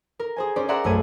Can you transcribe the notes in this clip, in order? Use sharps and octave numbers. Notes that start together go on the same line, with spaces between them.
A#4
G#4 C5 G#5
C#4 C5 D5
G#4 D5 E5 F#5 A#5 C6
B1 F#2 A3 C5 G#6 D#7